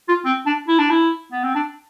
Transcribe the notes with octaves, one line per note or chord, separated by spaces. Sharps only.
F4
C4
D4
E4
D4
E4
B3
C4
D4